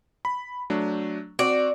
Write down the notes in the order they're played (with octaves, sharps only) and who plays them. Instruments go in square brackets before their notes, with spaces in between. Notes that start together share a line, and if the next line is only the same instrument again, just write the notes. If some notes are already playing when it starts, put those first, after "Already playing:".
[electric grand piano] B5
F#3 A3 D4
[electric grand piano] C4 F#4 [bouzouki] D5